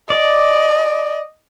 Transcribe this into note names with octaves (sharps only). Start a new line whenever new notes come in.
D5 D#5